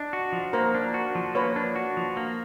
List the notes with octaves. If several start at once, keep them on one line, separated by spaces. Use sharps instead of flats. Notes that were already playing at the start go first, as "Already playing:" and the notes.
Already playing: D4 D#5
F#4
F3
A#3 A#4 C5
D4
F#4
F3
A#3 B4 C#5
D4
F#4
F3
A#3